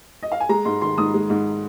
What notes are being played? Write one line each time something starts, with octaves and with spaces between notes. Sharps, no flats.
D#5
F5
G#5
G#3 A#5
G#2 C6
D#3 C6
G#2 D#6
G#3
G#2